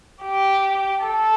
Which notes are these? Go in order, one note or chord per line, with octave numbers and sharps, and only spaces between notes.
G4
A4